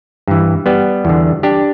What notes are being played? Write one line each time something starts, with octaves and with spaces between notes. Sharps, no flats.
G2 E3
G3 B3
E2 D3
D4 G4